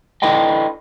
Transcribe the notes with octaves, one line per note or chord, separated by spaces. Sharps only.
D4 E4 A4 B4 D#5 G5